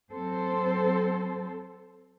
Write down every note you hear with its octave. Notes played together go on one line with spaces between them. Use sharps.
F#3 C4 A4 C5